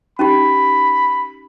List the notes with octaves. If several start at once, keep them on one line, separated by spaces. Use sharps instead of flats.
C#4 D#4 G4 B5